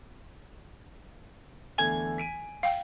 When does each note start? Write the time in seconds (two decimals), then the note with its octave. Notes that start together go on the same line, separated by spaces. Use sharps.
1.78 E2 D3 A3 G#5
2.18 B6 D7 D#7
2.63 F5 G5